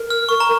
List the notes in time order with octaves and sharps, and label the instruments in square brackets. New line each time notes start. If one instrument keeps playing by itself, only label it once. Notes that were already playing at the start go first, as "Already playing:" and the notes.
Already playing: [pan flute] A#4
[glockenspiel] F6
C#6
A#5